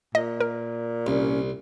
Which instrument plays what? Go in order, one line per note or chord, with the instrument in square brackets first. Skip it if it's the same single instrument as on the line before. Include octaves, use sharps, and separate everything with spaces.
[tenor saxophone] A#2 [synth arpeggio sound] D#5
[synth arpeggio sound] A#4
[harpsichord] C2 [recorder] C#4